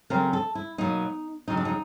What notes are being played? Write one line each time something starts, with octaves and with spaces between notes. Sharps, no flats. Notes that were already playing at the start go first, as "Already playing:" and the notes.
C#3 F#3 A3 C4 A#4
A4
E4
B2 F#3 A#3 D#4
F2 C#3 F#3 D#4
D4
D#4